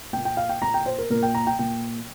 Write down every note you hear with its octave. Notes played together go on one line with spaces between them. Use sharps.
A#2 A#3 G5
G5
F5
G5
A#2 A#3 A#5
G5
C5
A#4
A#2 A#3 A#4
G5
A#5
G5
A#2 A#3 G5